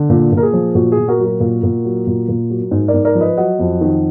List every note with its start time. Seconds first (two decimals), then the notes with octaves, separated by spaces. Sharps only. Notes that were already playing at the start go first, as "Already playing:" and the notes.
Already playing: D3
0.09 A#2
0.32 A#2
0.37 A#4
0.43 G#4
0.53 F3
0.75 A#2 F#4
0.92 G#4
0.97 A#2
1.08 F#4 A#4
1.19 F#3
1.24 F#4 A#4
1.40 A#2
1.63 A#2
1.85 F#3
2.07 A#2
2.29 A#2
2.50 F#3
2.71 G#2
2.88 A#4 D5
2.94 G#2
3.05 A#4 D5
3.15 F3
3.21 B4 D#5
3.37 F#3 D#5 F#5
3.59 F2
3.81 D#3